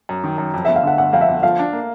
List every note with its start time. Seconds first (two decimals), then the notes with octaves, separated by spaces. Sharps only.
0.09 F#2
0.24 D#3
0.38 F#2
0.54 F2
0.65 E5
0.68 G1
0.76 F5
0.83 D3 F#5
0.98 G1 F#5
1.13 F2 F5
1.21 E5
1.29 G1
1.43 F3 F5
1.59 D4
1.73 A#3